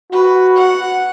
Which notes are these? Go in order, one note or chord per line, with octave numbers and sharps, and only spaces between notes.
F#4 B4
F#5